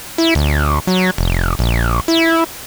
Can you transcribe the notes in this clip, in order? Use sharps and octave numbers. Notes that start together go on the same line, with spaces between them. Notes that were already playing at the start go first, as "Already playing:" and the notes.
E4
D2
F#3
F1
A#1
E4